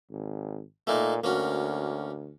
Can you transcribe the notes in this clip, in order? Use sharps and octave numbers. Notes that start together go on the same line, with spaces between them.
G#1
A#2 A3 A#3 D#4
D2 A#3 C#4 F#4